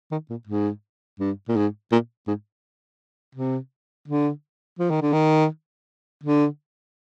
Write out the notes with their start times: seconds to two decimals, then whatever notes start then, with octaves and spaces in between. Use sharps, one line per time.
0.11 D#3
0.30 A#2
0.47 G#2
1.20 G2
1.48 A#2
1.56 G#2
1.92 A#2
2.27 G#2
3.35 C3
4.08 D3
4.79 F3
4.90 D#3
5.01 D3
5.13 D#3
6.24 D3